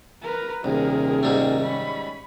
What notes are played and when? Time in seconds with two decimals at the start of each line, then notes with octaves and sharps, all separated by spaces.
0.23 A#4 B4
0.64 D#1 C2 C3 D#3 G#4 A#4
1.23 G#2 G3 A3
1.63 C#4 B5